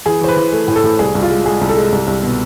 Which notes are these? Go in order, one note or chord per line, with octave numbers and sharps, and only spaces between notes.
E3 G#4
E3 C5
B4
E3
A3
A2
A4
A2
C2 G#4
C2
F4
G#3
G#3 G#4
C2
A4
G#3
C2
C2
B2